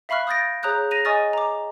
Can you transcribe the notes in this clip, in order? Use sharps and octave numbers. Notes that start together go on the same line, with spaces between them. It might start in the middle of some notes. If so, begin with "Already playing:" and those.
E5 F5 B5 C#6 F6 F#6
D#6 F6 G6 A6 A#6 D7
G#4 C#5 A#5 D#6 F#6 G6
A#6 D#7 F7
D#5 G#5 C#6 D#6 F6 A6
A#5 D6